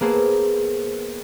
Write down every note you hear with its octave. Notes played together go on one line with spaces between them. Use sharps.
A#3 B3 G#4 A4 C5